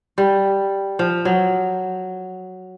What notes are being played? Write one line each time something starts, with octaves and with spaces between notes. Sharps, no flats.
G3
F3
F#3